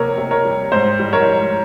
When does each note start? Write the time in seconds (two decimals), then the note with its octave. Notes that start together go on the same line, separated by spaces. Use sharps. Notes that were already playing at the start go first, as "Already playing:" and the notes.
Already playing: C3 A#3 A#4 C#5
0.18 C3
0.31 A#4 C#5
0.45 G3
0.72 G#2 C5
0.99 G3
1.13 A#4 C#5
1.27 G#2